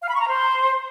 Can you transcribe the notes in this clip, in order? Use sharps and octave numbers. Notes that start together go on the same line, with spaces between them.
F5
B5
C#6
A#5
C5